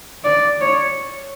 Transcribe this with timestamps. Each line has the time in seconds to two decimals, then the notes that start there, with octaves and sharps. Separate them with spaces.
0.24 D5
0.61 C#5